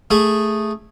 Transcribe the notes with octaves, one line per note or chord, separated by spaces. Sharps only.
A3 G#4